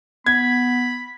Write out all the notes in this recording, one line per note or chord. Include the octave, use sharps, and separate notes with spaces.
B3 B5 G#6